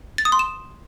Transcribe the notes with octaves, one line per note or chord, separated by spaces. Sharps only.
A6
D#6
C6
E7